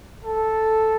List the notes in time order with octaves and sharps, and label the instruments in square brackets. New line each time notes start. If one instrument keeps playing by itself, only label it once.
[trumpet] A4